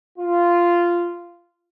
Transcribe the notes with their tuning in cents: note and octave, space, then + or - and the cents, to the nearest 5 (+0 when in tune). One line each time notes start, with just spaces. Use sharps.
F4 -10